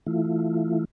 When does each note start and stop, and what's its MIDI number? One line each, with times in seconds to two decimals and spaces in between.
0.06 0.85 52
0.06 0.85 57
0.06 0.85 64
0.06 0.85 65